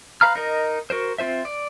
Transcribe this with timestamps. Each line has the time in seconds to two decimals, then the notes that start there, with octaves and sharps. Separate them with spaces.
0.21 B4 F5 A#5 F6
0.35 D#4 A#4 D#5
0.90 F#4 A#4 C5
1.18 C4 F4 C5 E5
1.45 D5